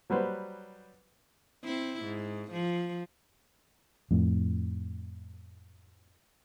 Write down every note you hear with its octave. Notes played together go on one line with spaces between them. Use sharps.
F#3 G3 B4 C5
C4 E4
G#2
F3
F2 A2